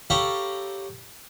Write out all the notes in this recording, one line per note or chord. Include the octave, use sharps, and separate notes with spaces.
G4 A4 C#5 F5 A#5 B5